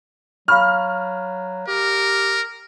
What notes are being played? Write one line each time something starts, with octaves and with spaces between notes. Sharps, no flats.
F#3 F5 B5 C#6 F6
G4 A#4